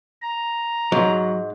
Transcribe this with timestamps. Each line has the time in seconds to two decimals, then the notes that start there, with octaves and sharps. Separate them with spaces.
0.22 A#5
0.92 G#2 F#3